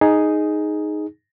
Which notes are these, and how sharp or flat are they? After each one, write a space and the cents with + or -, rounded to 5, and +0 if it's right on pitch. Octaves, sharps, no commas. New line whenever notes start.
D#4 +0 G#4 +5